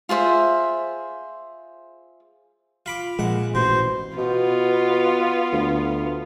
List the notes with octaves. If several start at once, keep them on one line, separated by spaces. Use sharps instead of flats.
F4 G#4 C5 E5
F4 B5 D6
A#1 A#2 G#3 F#5
A1 B2 C5
B2 B3 F4
D2